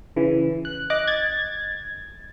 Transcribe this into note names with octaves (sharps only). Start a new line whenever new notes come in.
C#3 E3
F#6
D#5 D6 F#6
G#6 A6